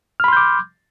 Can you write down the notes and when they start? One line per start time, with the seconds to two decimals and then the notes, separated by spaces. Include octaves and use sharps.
0.20 F6
0.24 B5
0.28 C6
0.33 G6
0.37 D6